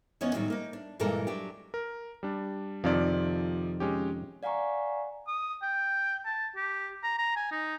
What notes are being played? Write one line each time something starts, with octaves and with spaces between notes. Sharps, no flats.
E2 B3 C#4 C#5 D#5
A2 D#3 F#3 G3
A#3 D#4
D4
G2 A#2 E3 G#3 A4 A#4
F#3 D4 G4
A#4
G3 D4
F2 C3 D#3 F3 D5
G#3 C#4 G4
D5 F5 F#5 G#5 A#5 C#6
D#6
G5
A5
G4
A#5
A#5
G#5
D#4